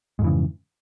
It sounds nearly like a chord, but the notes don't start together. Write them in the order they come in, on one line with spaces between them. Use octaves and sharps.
G#2 F2 E3 C#3